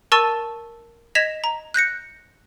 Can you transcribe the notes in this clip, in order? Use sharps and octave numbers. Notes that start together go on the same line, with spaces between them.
A#4 A5 C#6 E6 A6 D#7
D#5 G#6 A#6 B6 E7 F7
A#5
F#6 G6 A#6 C#7